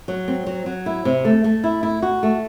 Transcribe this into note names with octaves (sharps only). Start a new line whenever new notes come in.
F#3
C4
F#3
F#3
E4
C3
A3
A3
E4
E4
F#4
A3